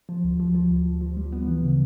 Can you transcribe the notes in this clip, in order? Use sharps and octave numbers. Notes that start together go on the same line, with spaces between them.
F3
D2
F3
F3
D2
D2
F3
G3
B3
E3
C#3